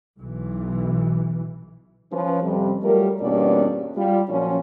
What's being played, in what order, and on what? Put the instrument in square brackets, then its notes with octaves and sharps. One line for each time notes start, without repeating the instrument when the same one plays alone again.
[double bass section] B1 E3
[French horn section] F3 C#4 B4
F2 C3 G3
F#3 G3 A3 F4 A#4
E2 G2 B2 A#3 C#4 D5
G3 F4
A#2 F3 F#3 C#4